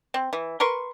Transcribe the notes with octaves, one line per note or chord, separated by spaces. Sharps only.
C4
E3
A#4 B4 C6 C#6